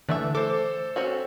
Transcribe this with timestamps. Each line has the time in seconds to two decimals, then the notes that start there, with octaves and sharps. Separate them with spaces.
0.09 D3 E3 A3 D4 E5
0.35 A4 C5 D6
0.96 C4 C#4 F#4